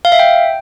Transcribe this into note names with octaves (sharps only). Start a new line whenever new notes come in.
F5
E5
G5